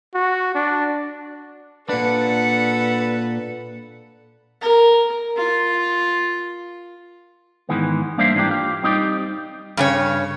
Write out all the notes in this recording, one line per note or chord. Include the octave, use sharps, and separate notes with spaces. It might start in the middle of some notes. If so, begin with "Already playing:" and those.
F#4
D4
A#2 D4 A4 B4 F#5
A#4
F4
G#2 D#3 E3 G#3 B3
G3 A#3 D4 C5 E5 F5
G#2 E3 A#3 D4 G4
F4 G4
G3 C4 D#4 E4 G4 D5
G2 C#3 C#5